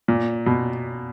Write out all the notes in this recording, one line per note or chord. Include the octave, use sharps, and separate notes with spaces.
A#2
B2